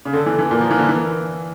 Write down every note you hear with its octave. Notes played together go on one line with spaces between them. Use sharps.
C#3
D3 A4
E3
E3
A#2 A#4
F3
E3
D3
E3